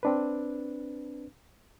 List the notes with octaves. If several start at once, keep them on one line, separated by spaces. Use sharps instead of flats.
C4 D4 B4